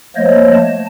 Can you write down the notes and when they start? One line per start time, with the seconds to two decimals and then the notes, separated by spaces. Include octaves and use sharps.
0.16 F3 A3 A#3 C5 C#5 D#5
0.54 A5